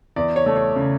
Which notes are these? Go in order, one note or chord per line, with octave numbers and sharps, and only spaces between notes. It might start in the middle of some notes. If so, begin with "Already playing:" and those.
E2 D5
C#5
A3
C#5
C#3